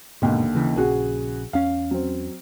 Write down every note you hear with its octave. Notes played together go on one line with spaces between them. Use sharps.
D#2 G#2 B2 D3
C#3 E3
A#1 C#3 F#4 G#4
E2 C#4 F5
F#3 C4